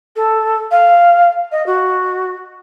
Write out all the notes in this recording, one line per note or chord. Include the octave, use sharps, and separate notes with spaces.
A4
F5
D#5
F#4